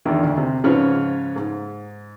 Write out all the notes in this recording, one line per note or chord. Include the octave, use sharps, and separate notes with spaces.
E2 D3 D#3
D2
C3
G#2 C#3 F3 B4 C#5 F6
G#2